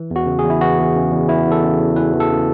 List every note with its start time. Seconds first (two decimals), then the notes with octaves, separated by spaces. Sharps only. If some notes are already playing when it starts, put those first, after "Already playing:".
Already playing: E3
0.11 E2
0.16 F#4
0.26 C#3
0.39 G#4
0.44 E2
0.50 E4
0.61 E3 F#4
0.79 E2
0.96 C#3
1.12 E2
1.28 E3 E4
1.46 E2
1.52 A4
1.63 C#3
1.80 E2
1.96 E3 B4
2.13 E2
2.20 A4
2.31 C#3